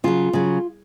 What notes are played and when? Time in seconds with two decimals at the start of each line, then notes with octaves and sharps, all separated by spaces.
0.04 C#3 F#3 F4
0.33 C#3 F#3